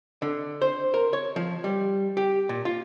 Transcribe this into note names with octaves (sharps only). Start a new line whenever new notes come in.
D3
C5
A#4
C#5
F3
G3
G4
A#2
F4